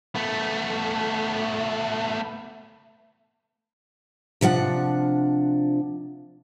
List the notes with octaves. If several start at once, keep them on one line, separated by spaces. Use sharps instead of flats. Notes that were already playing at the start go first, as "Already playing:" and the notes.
A3 B3
C3 F3 D4 F#5